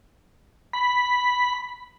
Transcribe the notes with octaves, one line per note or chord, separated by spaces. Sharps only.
B5